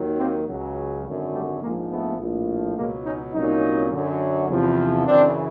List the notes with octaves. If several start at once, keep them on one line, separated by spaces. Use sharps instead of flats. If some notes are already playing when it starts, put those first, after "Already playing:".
Already playing: D#2 D#3 F#3
A#3 C4
C#2 C#3 F#3
G#1 F#2 D3 F#3
G3 A3
A#1 G#2 F3 G#3 A#3
A3 B3
A#1 A2 F3
C#2 B2 F#3 G#3 A#3
C#4 D#4
C2 A#2 F#3 C#4 D#4
F#2 D3 F#3
E2 C3 F3
F#2 C#3 E3 C4 D4